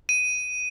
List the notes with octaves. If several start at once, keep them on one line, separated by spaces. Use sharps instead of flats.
D#7